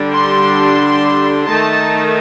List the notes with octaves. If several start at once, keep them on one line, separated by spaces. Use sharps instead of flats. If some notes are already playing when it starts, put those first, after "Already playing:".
Already playing: D3 G3 D4
C6
D#3 A3 D#4 A5